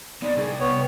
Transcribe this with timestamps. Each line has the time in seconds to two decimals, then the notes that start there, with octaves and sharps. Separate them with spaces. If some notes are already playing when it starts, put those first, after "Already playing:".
0.22 B3 C4 D#4 D5
0.37 C3 G3 G#4
0.60 B3 C#5 G5